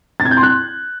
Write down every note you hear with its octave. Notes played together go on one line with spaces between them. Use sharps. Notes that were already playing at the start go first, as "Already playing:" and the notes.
A6
G#6
G6
C6
F#6